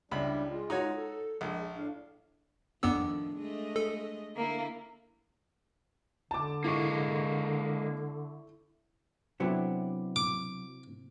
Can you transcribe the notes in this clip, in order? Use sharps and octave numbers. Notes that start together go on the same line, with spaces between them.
C#2 G3 D4 E4 B5
G#3 F4
D#4 F#4 C#5
A4
A#1 G#3
A2 D4 F5
F2 A2 D#3 F3 B3 D4 E6
G#3 A3 D#5
A4
D3 A#3 E4
D3 A5 D6
G#3 A#3 E4 C#6
C3 F#3 B3 D4 E4 A4
D6